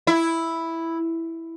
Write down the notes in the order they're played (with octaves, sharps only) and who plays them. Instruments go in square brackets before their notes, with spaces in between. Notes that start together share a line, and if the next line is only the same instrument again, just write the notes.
[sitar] E4